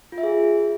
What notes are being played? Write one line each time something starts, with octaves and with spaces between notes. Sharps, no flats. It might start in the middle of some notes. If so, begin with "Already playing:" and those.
F4
E5
G#4